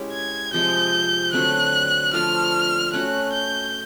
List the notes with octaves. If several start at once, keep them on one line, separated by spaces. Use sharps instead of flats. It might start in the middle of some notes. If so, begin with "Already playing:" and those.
Already playing: G#3 C#4 E4 G4
G#6
C3 F3 G#3 G6
D3 F#3 A3 C4 F#6
F3 A3 D4 F4 F6
A3 C#4 F#4 F#6
G6